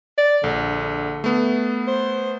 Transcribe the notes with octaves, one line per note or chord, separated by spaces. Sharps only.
D5
A#1 D3
A3 B3
C5